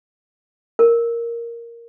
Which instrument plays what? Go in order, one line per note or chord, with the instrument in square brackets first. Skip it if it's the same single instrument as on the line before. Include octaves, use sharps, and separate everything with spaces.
[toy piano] A#4